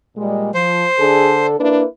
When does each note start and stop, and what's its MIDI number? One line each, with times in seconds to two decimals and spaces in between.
0.17 0.54 46
0.17 0.54 55
0.17 0.54 56
0.54 0.85 53
0.54 1.46 72
0.99 1.56 50
0.99 1.56 62
0.99 1.36 68
0.99 1.56 69
1.60 1.86 58
1.60 1.82 62
1.60 1.86 64
1.60 1.86 71